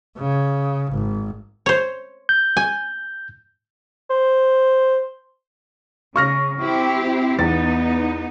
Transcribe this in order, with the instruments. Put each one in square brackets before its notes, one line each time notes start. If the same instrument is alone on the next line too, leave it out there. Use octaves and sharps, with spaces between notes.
[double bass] C#3
G#1
[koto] C5 C#5
[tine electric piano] G6
[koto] G#5
[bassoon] C5
[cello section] C#3 [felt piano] C#6 F6 A#6
[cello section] C4 E4 G4
[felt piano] E2 A6 [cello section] B3 D#4